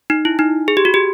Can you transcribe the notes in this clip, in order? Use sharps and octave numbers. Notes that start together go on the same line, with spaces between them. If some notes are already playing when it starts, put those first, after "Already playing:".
D#4
E4
D#4
G#4
G4
F#4
G4